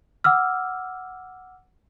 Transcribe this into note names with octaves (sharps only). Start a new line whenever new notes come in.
F#5 D6 E6 F6